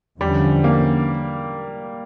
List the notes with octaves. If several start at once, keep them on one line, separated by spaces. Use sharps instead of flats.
E2 D3 F3 G3 C#4
A#3